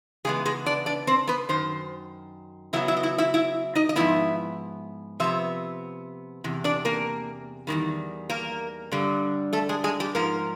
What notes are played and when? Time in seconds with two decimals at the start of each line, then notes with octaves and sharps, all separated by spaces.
0.25 C#3 E3 G#3 B3 G#4
0.45 G#3 G#4
0.66 D4 D5
0.86 D4 D5
1.07 C4 C5
1.28 B3 B4
1.49 F#2 D#3 C5
2.73 C#3 F#3 B3 E4 E5
2.88 E4 E5
2.97 D#5
3.03 E4 E5
3.18 E4 E5
3.34 E4 E5
3.75 D#4 D#5
3.89 D#5
3.96 G#2 F3 G#3 B3 E4 E5
5.20 C3 F3 B3 E5
6.44 E2 C3
6.64 D4 D5
6.85 A#3 A#4
7.67 E2 C3 D#3 G3
8.29 A#3 A#4
8.92 G2 D3 G3
9.53 A3 A4
9.69 G#3 G#4
9.84 G#3 G#4
10.00 G3 G4
10.15 G#2 F3 A#3 A#4